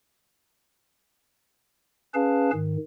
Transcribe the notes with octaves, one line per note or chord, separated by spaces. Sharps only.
C#4 G#4 B4 F5 A5
G#2 D#3